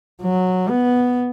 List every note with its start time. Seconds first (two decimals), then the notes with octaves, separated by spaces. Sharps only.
0.22 F#3
0.69 B3